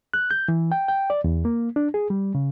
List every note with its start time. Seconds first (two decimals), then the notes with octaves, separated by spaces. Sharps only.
0.14 F#6
0.31 G6
0.48 E3
0.72 G5
0.88 G5
1.10 D5
1.24 E2
1.45 A#3
1.76 D4
1.94 G#4
2.10 G3
2.35 C#3